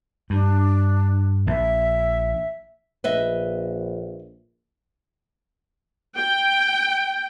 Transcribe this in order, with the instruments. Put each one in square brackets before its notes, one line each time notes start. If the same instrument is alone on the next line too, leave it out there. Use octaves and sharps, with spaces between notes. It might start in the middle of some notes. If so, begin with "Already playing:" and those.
[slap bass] G2 [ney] D4
[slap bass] A#1 [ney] E5
[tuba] A#1 [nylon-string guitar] B4 D#5 E5
[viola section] G5